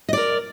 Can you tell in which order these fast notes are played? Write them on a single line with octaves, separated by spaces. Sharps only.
D#5 D5 A#4